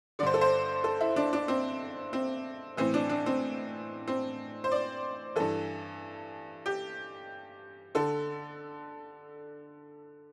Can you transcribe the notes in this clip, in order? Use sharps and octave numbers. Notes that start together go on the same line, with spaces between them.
G2 D3 C5 D5
A4
C5
A4
E4
D4
D4
C4
C4
A2 E3 C4
D4
D4
C4
C4
C5
D5
G2 E3 A4
G4
D3 A4